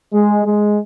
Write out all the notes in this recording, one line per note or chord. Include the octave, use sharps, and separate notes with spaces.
G#3
G#3